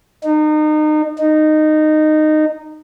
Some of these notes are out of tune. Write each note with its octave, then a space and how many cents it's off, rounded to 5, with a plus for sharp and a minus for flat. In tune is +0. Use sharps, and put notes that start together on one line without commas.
D#4 -30
D#4 -15